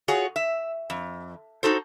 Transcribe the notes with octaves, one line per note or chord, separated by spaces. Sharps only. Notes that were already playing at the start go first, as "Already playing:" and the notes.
F4 F#4 G#4 C#5
E5
F2
D#4 F#4 A4 C5